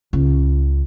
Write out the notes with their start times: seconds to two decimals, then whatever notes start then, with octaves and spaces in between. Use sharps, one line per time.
0.13 C#2